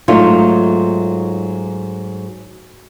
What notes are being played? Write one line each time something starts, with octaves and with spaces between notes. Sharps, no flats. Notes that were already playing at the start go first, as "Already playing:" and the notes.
G#2 F#3 A3 D#4 F4